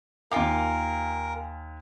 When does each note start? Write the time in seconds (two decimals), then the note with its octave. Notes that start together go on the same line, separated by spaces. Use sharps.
0.31 D#2 F4 A#4 F5 G5 G#5 D6